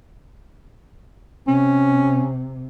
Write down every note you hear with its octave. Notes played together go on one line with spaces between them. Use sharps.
C3 C#4